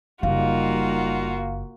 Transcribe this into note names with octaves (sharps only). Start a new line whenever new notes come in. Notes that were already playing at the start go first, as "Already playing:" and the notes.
F#1 G3 A#3 D#4 F4 F#4 F5